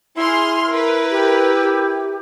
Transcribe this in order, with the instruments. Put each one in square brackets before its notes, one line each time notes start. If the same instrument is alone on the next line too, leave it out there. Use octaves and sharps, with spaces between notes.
[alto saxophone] E4 [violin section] G#4 C6 F6
[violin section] A#4 B4
[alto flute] G4